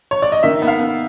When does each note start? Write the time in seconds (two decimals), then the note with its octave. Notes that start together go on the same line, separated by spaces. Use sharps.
0.11 C#5
0.22 D5
0.32 D#5
0.43 D#3 E5
0.62 B3
0.68 F5
0.80 B3